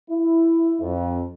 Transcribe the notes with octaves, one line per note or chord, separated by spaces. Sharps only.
E4
F2